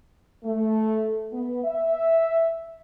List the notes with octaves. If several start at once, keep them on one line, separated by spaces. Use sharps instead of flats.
A3
B3
E5